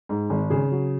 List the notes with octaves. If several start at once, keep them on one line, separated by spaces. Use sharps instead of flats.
G#2
G#1
C#3 G#4
F#3